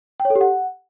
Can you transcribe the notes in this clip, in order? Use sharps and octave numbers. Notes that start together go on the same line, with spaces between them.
G5
C#5
A4
G4
F#5